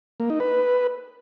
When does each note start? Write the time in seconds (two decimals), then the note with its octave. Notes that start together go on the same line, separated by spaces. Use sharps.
0.20 A#3
0.30 D#4
0.40 B4